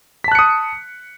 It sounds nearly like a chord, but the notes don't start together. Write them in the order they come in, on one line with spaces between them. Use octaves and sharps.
B6 A5 F#6 C#7 D#6